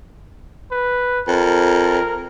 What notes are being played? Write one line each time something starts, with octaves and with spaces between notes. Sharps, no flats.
B4
F2 A#4